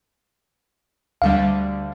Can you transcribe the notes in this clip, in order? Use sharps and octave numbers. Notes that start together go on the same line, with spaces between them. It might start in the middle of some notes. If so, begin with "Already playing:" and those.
D2 D3 G3 F5